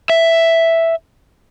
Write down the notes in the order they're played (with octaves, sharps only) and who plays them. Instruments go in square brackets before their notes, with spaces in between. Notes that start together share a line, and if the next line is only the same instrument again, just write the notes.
[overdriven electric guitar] E5